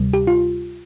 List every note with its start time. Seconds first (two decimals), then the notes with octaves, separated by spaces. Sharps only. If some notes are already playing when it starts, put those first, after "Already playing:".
Already playing: D2 C3 G3
0.13 G4
0.27 F4